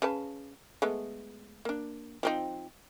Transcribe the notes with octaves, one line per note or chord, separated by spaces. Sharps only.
C#3 B4 A5
G#3 A3 B3
A#3 D4
F3 C4 D#4